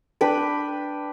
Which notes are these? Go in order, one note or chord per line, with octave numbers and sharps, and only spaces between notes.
D4 B4 G5 B5